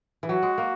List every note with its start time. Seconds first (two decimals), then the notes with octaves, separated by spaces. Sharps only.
0.23 E3
0.29 F#3 F#4
0.43 G#3
0.58 A#3